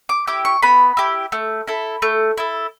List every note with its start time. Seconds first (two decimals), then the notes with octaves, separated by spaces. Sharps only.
0.09 D6
0.27 E4 G4 D6
0.45 C#6
0.62 B3 B5
0.97 E4 G4
1.32 A3
1.68 E4 A4
2.02 A3
2.37 E4 A4